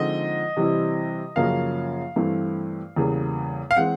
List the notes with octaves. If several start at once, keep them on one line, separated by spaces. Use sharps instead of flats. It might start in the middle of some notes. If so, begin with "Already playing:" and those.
Already playing: D3 F3 G#3 C4 D#4 D#5
C3 E3 G3 C4 E4
F#2 C#3 F3 A#3 C#4 F5
G2 E3 A3 C4 E4
E2 C#3 E3 G3 A#3
F5
E3 G#3 C4 F#5